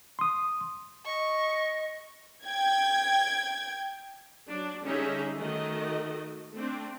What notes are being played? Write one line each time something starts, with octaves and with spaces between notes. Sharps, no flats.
C6 D#6
D#5 C#6
G5 G#6
F#3 D4
D3 G3 C#4 D#4 G#4 E5
D#3 A3 F#4 D#5
A3 C4 D4